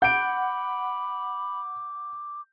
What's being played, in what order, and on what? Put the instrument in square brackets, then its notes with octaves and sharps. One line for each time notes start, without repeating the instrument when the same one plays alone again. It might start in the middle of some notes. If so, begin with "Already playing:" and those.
[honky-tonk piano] F#5 [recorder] B5 [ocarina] D6 [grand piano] G6 D7